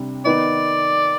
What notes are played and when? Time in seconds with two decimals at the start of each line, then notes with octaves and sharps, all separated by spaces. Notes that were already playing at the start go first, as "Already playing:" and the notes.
Already playing: C3 G3 D4
0.25 D#3 B3 D#4 D5